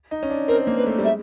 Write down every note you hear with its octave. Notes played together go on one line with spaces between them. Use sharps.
D#4
C#4
D4
C4 A#4
A#3
B4
A3
G3
G#3 E5